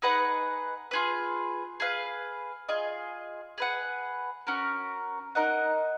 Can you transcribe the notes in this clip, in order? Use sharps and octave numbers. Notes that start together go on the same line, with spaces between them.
D#4 G#4 B4 F#5
F4 G#4 B4
G#4 B4 F5
F4 G#4 D#5
G#4 B4 F#5
C#4 F#4 A#4
D#4 A#4 D#5 F#5